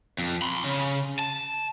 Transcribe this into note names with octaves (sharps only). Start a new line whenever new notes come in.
F2
B5 C6
C#3
A5